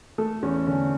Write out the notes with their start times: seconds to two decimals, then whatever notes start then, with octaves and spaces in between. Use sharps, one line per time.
0.18 A3 A4
0.43 E2 C#4
0.67 D3 C#4